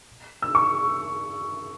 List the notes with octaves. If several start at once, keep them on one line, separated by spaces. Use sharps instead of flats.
E6
C#6